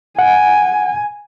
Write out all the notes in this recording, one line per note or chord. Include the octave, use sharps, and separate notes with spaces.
F#5 G#5